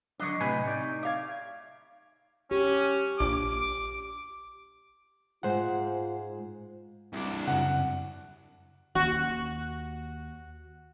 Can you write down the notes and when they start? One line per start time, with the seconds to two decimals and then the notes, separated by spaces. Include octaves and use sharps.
0.20 D3 F#3 D4 D#5 C#6
0.40 A2 C3 B4 G#5
0.68 D#4 D5
1.03 E5 F5 D6 G#6
2.51 C#4 G4
3.20 A#1 D6
5.43 G#2 G#3 F4 C5 F#5
7.13 C2 D4
7.48 F#2 C#3 F#5
8.95 D#2 F#4